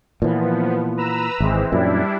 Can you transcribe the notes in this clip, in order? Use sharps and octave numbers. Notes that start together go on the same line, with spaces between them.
A#2 E3 F3 B3
B4 A#5 E6
G#1 E3 G#3 C4
F#2 A#2 G3 D4 E4